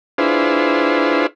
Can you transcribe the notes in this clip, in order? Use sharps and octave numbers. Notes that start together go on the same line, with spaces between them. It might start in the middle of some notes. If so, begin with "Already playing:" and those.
D4 E4 F4 G#4 B4 C5